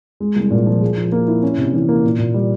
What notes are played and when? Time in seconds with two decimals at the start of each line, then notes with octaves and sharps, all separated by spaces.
0.20 G#3
0.36 C2
0.51 A#2
0.66 F3
0.82 G#4
0.97 F3
1.12 A#3
1.27 E4
1.43 C#4
1.58 C3
1.73 E3
1.89 A#3
2.04 A#2
2.19 A#2
2.34 G3